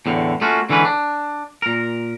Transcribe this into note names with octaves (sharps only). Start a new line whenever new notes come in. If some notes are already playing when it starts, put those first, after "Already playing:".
E2 A2 D3
A3 A#3 C#4 F4 F#4
D3 E3 G#3 C#4 B4
D4
A#2 A#4